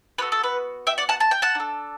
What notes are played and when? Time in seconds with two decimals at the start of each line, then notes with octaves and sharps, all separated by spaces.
0.18 B3 F#4 A4 B4
0.32 A4
0.44 B4
0.87 E5 G5
0.98 D5 F#5
1.09 F#5 A5
1.20 A5
1.31 G5
1.42 F#5 A5
1.55 D4 A4